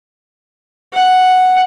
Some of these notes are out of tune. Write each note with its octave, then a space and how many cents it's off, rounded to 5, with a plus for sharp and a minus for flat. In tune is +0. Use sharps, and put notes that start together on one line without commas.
F#5 +0